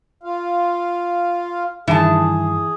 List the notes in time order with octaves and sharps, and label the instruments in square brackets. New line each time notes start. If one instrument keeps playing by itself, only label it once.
[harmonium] F4 F5
[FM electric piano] G2 D#3 [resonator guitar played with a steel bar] E3 A5 [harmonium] G#4